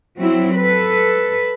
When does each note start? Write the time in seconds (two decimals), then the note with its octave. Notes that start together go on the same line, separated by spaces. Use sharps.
0.19 F#3 C4 E4
0.56 A4 B4